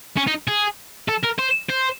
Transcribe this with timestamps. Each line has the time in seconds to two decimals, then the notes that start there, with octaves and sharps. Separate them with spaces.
0.17 C#4
0.27 D#4
0.48 G#4
1.08 A4
1.23 A#4
1.38 C5
1.70 C5